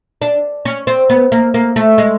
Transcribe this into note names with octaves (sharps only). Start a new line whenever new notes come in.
D4
C#4
C4
B3
A#3
A#3
A3
G#3